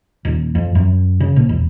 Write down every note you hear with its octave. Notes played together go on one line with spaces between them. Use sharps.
D#1
F2
F#2
C#3
A#1
E1